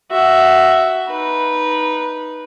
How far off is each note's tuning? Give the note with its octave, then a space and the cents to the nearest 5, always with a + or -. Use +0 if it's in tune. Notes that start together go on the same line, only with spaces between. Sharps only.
F#4 +10 E5 +0
D#4 +0 B4 -10